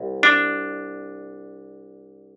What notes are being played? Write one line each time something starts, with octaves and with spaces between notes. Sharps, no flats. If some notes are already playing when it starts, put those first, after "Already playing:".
Already playing: C2
D4